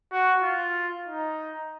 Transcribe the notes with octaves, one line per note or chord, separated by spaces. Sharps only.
F#4
F4
D#4